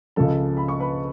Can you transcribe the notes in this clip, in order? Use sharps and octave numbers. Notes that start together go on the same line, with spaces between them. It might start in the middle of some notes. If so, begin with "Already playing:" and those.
C#2 C#3 F3 A4 A5
B5
C#6
B4 B5